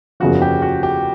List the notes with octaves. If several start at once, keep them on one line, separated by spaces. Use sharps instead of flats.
F#1 E2 C#3 F3 F#4
G4
F#4
G4